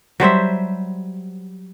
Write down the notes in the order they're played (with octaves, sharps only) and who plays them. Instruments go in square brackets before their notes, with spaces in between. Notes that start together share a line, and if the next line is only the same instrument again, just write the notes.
[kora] F#3 G3 C5 E5